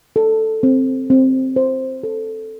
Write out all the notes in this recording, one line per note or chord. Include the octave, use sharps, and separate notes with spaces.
A4
C4
C4
C5
A4